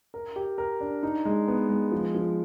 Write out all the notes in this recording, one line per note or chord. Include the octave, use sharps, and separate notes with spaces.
A#4
G4
A#4
D4
D#4
G#3
B3
G#3
F3
F3